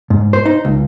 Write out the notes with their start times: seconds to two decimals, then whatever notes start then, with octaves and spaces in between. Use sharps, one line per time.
0.10 G#2
0.33 C5
0.45 D#4
0.65 C#2